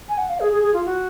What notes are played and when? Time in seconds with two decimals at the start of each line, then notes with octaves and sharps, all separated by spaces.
0.09 G#5
0.18 F#5
0.29 F5
0.40 G#4
0.52 G#4
0.62 G#4
0.74 F4
0.86 F#4